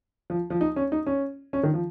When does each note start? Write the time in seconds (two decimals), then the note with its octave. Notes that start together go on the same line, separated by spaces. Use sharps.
0.30 F3
0.50 F3
0.61 D#4
0.76 C#4
0.92 D#4
1.06 C#4
1.53 C#4
1.63 D#3
1.74 F3